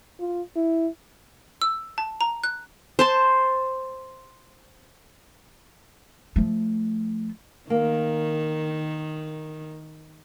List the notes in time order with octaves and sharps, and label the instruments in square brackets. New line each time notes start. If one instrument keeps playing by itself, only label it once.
[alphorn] F4
E4
[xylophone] E6
A5
A#5
F#6
[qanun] C5 A5 C6
[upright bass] F3 A3
[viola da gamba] D#3 [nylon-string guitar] A#3